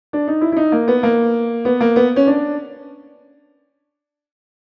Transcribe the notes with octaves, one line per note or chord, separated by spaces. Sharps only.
D4
D#4
E4
E4
D#4
A#3
B3
A#3
B3
A#3
B3
C#4
D4